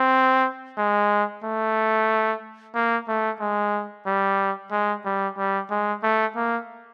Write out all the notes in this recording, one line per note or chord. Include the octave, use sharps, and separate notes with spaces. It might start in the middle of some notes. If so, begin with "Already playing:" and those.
Already playing: C4
G#3
A3
A#3
A3
G#3
G3
G#3
G3
G3
G#3
A3
A#3